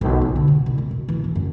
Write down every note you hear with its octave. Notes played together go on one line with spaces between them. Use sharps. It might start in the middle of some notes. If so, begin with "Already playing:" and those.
B1
F2
D3
B2
C2
G3
B2
E3
C#4
F#2